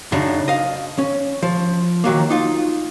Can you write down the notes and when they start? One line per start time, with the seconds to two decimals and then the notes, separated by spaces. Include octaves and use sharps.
0.12 F#2 C#3 D4 D#4
0.48 D#5 F5
0.98 C#4
1.43 F3
2.04 D#3 F#3 A#3
2.30 D#4 F4